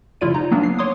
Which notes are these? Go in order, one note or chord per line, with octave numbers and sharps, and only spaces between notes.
C#3 F3 E4 F4 D5 D#7
D#4 A#5
F#3 A#3 B3 D4
C7
C#5 C6 D6 D#6